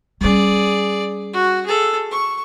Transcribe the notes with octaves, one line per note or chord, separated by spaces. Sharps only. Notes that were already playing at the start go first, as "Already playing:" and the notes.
G3 C#4 G#4 D5
F#4
G#4 A4
C#6